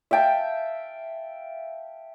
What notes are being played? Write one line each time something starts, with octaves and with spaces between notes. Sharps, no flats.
E5 F5 G5 A5